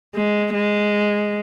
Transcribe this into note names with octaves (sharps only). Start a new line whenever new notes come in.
G#3
G#3